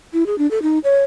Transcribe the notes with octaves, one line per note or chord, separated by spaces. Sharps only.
E4
G#4
D4
A4
D#4
C#5